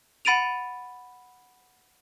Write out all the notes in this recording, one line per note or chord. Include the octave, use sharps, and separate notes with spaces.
F#5 B5 A6 D7 D#7 F7